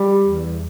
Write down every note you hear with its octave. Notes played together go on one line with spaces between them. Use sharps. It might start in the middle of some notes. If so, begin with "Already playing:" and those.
Already playing: G3
E2